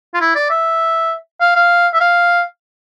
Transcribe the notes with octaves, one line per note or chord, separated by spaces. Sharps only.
F4
E4
D5
E5
F5
F5
E5
F5